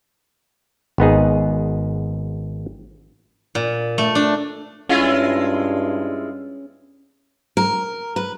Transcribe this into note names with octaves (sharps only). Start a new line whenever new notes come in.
G#1 B3 D#4 G#4
A#2
A3
D4
G2 G#3 C#4 E4 F4
A#4
B4